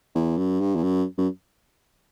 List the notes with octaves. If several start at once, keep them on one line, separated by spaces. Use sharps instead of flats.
E2
F#2
G2
E2
F#2
F#2